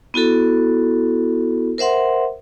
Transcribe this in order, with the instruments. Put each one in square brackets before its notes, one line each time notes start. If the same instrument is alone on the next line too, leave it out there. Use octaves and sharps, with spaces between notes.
[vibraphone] B3 E4 F#4 A4
A#4 C5 E5 F#5 C6